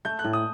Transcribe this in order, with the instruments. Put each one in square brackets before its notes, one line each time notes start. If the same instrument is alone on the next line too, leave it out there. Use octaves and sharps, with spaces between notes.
[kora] A3 [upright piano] G6
[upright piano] F#6
[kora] A2
[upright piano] D#6